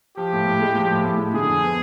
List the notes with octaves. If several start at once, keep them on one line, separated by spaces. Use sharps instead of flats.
F3 G4
A2
A2
G#3
F3
A2
A2
G#3
D3 G#4
F2
B3